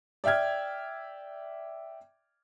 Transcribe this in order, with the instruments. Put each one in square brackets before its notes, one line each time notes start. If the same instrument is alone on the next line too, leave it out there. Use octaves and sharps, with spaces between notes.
[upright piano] D5 E5 G5 F6 G#6